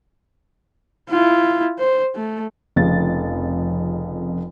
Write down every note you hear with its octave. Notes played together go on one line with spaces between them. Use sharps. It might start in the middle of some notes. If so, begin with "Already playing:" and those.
E4 F4
C5
A3
F1 F2 C#3 A6